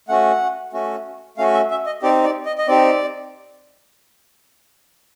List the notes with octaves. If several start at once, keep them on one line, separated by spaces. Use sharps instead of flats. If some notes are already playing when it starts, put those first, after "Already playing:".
A3 C#4 F#4 F#5
A3 C#4 F#4
A3 C#4 F#4 F5
E5
E5
D#5
C4 D#4 G4 D5
D5
D#5
D#5
C4 D#4 G4 D5